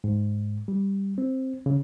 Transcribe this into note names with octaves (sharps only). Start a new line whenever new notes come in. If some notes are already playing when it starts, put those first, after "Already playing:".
G#2
G3
C4
C#3